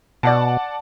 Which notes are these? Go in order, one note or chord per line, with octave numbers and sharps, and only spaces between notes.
B2 D5 F#5 A5